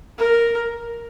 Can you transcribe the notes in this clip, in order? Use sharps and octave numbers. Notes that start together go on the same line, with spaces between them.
A#4